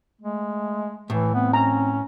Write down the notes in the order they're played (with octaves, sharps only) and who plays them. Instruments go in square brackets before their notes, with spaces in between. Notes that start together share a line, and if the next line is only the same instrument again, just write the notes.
[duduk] G#3 [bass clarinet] A3
[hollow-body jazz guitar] A2 [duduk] E3
[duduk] B3 [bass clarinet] C4
[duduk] C#4 [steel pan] A#5